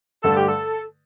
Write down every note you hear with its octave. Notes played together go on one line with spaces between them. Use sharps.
G2 D3 A3 A4
G4
A4